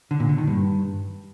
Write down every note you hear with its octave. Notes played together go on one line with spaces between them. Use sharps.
D3
A#2
D3
D#3
G2